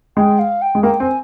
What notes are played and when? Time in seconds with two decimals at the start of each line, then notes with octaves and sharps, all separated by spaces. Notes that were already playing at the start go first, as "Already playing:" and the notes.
0.17 G#3 G5
0.39 F5
0.61 G5
0.75 G#3
0.83 A#3 G5
1.00 C4 G#5